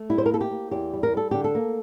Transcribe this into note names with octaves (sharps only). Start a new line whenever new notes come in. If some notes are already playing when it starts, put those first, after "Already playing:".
Already playing: A3
G3 E4
C5
A#4
A#3 A4
G4
A#3
E2 G4
G3
A#4
G3 A4
D3 G4
A4
A#3